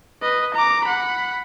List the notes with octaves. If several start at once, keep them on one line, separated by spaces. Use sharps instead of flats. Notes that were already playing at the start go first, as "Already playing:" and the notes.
B4 D#5
A#5 D6
F#5 B5